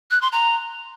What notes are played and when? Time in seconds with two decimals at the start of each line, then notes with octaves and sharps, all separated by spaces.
0.11 F#6
0.22 C6
0.32 A#5